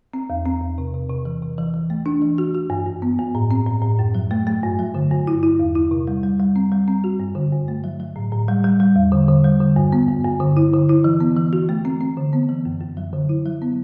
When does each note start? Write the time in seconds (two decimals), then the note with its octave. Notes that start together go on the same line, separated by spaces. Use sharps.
0.14 C4
0.30 E2
0.45 C4
0.62 E2
0.78 C3
0.94 C3
1.10 C3
1.25 E3
1.42 C3
1.58 E3
1.74 E3
1.90 A3
2.06 D4
2.22 E3
2.38 F#4
2.55 F#4
2.70 G2
2.87 G2
3.02 B3
3.18 G2
3.35 A2
3.51 C4
3.67 A2
3.82 A2
3.99 F#2
4.15 F#3
4.31 A3
4.47 A3
4.63 G2
4.79 F#3
4.95 D3
5.11 G2
5.27 E4
5.43 E4
5.59 E2
5.75 E4
5.91 C3
6.07 G3
6.23 G3
6.40 G3
6.56 C4
6.72 G3
6.88 C4
7.04 F#4
7.20 G2
7.35 D3
7.52 G2
7.68 A3
7.84 F#3
8.00 F#3
8.16 A2
8.32 A2
8.48 G3
8.64 G3
8.80 G3
8.96 E2
9.12 D3
9.29 D3
9.44 G3
9.60 D3
9.76 G2
9.92 B3
10.08 G2
10.25 G2
10.40 D3
10.57 E4
10.73 D3
10.89 E4
11.04 E3
11.20 B3
11.37 E3
11.53 F#4
11.69 A3
11.85 C4
12.01 C4
12.17 D3
12.33 B3
12.49 E3
12.65 F#2
12.81 F#2
12.97 F#3
13.13 D3
13.29 E4
13.45 F#3
13.62 B3